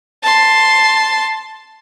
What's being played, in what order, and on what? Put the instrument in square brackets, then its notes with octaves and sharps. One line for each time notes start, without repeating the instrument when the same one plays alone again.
[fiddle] A5 C6